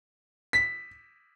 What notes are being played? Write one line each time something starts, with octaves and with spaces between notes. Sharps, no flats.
B6